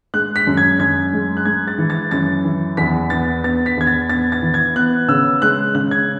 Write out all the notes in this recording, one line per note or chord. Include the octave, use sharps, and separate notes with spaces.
G#3 F#6
B6
F#2
G#6
F#2 G#6
G#3
F#6
G#3 G#6
A6
E3
A6
F#2 A6
E3
E2 B6
B3 A6
B3 A6
B6
E2 G#6
A6
B3 A6
A6
E3
G#6
B3 F#6
C#3 E6
G#3 F#6
C#3 F#6
G#6